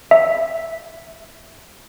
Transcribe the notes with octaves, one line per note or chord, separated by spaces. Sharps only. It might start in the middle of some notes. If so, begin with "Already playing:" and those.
E5